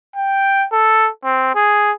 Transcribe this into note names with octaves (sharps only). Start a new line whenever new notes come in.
G5
A4
C4
G#4